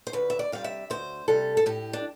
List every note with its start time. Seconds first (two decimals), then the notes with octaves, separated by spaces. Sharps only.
0.07 C5
0.13 D2 B4
0.30 E5
0.39 D5
0.52 C3 G3 F5
0.64 E5
0.90 D2 C5
1.28 C3 G3 A4
1.57 A4
1.66 A2 G4
1.93 D4